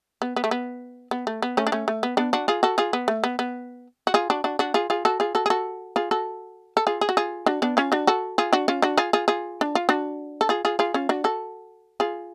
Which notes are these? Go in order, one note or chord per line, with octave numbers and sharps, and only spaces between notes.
B3
B3
A3
B3
B3
A3
B3
A3 C#4
D4
A3 C#4
A3
B3
B3 D4
D4 F#4
F4 G#4
F#4 A4
F4 G#4
B3
A3
B3
B3
F#4
F4 G#4
D4 F#4
D4 F#4
D4 F#4
F4 G#4
F4 G#4
F#4 A4
F4 G#4
F#4 A4
G#4
F#4 A4
F4 G#4
F#4 A4
A4
F4 G#4
G#4
F#4
F4 G#4
D4 F#4
B3 D4
C#4 F4
D4 F#4
F#4 A4
F4 G#4
D4 F#4
C#4 F4
D4 F#4
F4 G#4
F4 G#4
F4 G#4
D4
F4
D4 F#4
A4
F4 G#4
F4 G#4
F4 G#4
C#4 F4
D4 F#4
F#4 A4
F4 G#4